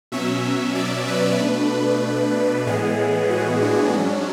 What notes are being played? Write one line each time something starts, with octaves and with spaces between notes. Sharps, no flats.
B2 F#3 C#4 E5
D5
B4
B2 A3 D4
A2 E3 G#3 B3 G#4
F#4
D4
G#2 F#3 C#4